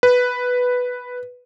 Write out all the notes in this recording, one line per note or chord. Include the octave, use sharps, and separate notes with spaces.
B4